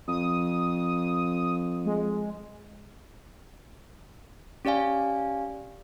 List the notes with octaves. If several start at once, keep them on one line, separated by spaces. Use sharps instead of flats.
F2 D#6
G#3
C#4 G4 D5 F5 G#5